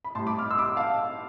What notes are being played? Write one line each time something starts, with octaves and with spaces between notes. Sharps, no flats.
B5
A2 G3 A5 C6
B5 D6
D6 F6
C6 E6
B5 D6
F5 A5